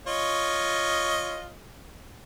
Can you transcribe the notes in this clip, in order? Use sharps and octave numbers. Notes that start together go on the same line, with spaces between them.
F4 C#5 D#5